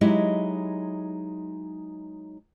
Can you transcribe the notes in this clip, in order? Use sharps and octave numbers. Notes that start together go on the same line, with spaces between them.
F#3 G#3 D#4 E4 G4 D#5